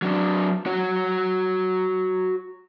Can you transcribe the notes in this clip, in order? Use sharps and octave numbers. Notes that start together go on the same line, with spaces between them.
F#3 D4
F#4 C#5